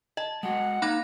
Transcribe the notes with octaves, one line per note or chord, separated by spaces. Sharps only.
D#5 A5
G#3 F#4 F#5
A#3 D#4 B5 F#6 A#6